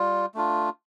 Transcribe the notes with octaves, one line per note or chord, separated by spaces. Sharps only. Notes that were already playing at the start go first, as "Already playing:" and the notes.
Already playing: G3 F4
A3 D4 F4